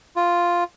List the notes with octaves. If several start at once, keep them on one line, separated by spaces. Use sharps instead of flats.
F4